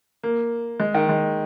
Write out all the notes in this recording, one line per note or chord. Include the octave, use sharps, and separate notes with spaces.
A#3
G#3
D#3
G#3